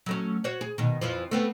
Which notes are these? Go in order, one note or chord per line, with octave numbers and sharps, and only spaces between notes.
F#3 A3 C#4
F#4 C5 C#5
G#4
B2 D#3
F2 E3 F3
A3 B3 C4